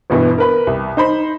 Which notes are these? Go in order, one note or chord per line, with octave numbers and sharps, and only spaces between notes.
G1 G2 B2 E3
A#4 B4 B5
C2
D#4 C5 B5